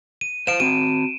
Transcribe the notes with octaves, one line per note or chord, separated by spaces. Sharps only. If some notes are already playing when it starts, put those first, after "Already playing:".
D#7
C5 F5 D7 E7
C4 F#4 D#7